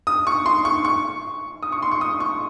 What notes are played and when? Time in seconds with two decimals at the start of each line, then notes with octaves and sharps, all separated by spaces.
0.07 D#6
0.27 C#6
0.46 C6
0.65 C#6
0.85 C#6
1.63 D#6
1.72 C#6
1.82 C6
1.92 C#6
2.01 D#6
2.20 C#6